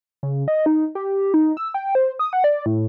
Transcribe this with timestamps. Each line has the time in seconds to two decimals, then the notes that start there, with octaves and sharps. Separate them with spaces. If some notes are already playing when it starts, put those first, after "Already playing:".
0.23 C#3
0.48 D#5
0.66 D#4
0.95 G4
1.34 D#4
1.57 E6
1.74 G5
1.95 C5
2.19 D#6
2.33 F#5
2.44 D5
2.66 A2